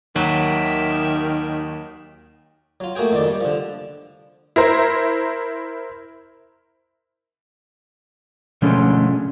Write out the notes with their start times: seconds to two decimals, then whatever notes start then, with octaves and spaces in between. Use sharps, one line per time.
0.16 D#2 D#3 F#3 G4 E5
2.80 F#3 F4
2.95 A3 A#3 F#4 G#4 G5
3.12 F2 D#3 D5
3.27 G3
3.41 D3 F3
4.56 E4 A#4 C5
8.62 B2 D3 F3 G#3 A3 C#4